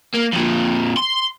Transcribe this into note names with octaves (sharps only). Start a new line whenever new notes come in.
A#3
F2 A#2
C6